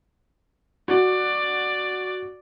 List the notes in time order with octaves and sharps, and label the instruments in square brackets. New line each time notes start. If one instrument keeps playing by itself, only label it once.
[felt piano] F#4 [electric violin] D5